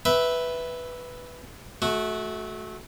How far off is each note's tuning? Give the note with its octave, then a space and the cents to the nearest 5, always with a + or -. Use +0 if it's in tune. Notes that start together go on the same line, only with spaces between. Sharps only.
B4 +0 E5 -5 G5 +0
A3 -25 F#4 +0